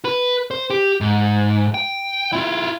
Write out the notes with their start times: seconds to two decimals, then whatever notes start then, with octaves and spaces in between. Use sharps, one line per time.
0.05 B4
0.51 C5
0.70 G4
1.01 G#2
1.74 G5
2.33 E4 F4